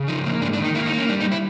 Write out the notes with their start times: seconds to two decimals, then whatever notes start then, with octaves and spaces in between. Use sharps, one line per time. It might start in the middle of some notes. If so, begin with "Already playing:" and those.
Already playing: C#3
0.08 F3 D#4
0.25 A#3
0.41 G#2 D4
0.53 D4
0.59 D#3
0.64 D#4
0.75 A#3 E4
0.86 D#4
0.93 A#3
0.98 C#4
1.09 G3 D4
1.20 D#4
1.32 E4